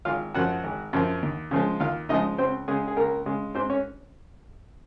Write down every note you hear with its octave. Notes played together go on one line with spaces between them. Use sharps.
G#1 F4 F5
F#2 F3 F#4 F#5
G#1
F#2 F3
D#2
C#3 F3 G#3
D#2 F4 F5
C#3 F3 G#3 D#4 D#5
C#2 C4 C5
C#3 G#3 G#4
G#4
C#2 A#3 A#4
C#3 G#3
G#2 C4 C5
C#4 C#5